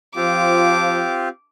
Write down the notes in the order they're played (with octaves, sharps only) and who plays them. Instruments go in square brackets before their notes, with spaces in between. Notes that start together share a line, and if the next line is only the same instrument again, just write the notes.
[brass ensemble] F3 [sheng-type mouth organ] C4 F4 G4 [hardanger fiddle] D6